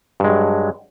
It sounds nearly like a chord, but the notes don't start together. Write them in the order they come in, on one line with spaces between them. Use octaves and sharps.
G2 G#3 F#3